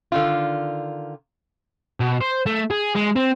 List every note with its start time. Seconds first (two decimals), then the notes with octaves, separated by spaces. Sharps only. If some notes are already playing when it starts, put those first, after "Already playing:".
0.12 D3 D#3 F4
2.00 B2
2.21 C5
2.46 A3
2.70 G#4
2.95 G#3
3.16 C4